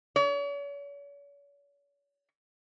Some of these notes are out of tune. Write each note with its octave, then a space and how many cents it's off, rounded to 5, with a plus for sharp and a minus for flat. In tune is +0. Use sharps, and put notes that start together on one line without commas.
C#5 +40